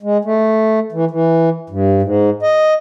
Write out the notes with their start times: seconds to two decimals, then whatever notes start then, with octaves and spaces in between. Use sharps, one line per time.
0.03 G#3
0.25 A3
0.92 E3
1.11 E3
1.70 G2
2.02 G#2
2.43 D#5